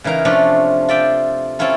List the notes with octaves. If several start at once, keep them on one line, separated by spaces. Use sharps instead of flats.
C#3 E3 D#4 A#4 F5
C3 F3 A3 C#4 D4 F4
F4 D5 E5 G5
C4 C#4 E4 F4 A4